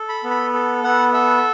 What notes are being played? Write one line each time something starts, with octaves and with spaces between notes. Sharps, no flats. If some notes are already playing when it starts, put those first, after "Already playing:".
Already playing: A4
B5
B3
B5
A4
B3 F#5
A4 E5